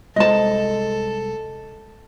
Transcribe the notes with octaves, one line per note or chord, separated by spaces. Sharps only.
C2 G#3 A4 C5 D#5 A5